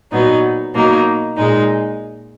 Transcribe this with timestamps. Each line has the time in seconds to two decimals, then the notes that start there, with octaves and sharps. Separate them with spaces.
0.12 A#2 F#3 B3 D#4
0.74 B2 F#3 A#3 D#4
1.37 A#2 G#3 D#4